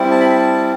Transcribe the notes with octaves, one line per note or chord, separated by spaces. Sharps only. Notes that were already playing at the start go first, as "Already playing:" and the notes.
Already playing: G3 C4 E4
A5
B5
A5